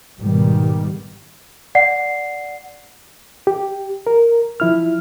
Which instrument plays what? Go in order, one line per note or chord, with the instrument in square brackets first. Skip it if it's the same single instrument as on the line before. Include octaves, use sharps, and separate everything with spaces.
[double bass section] G#2 B2 D#3 G3
[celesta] D5 F#5 C7
[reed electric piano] G4
A#4
F3 E4 F6